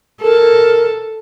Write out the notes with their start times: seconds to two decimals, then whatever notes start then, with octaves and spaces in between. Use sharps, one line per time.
0.22 A4 A#4